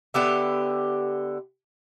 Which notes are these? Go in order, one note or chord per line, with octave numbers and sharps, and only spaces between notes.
D3 B3 G4 E5